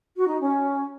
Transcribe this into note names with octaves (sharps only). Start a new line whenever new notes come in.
F#4
D#4
C#4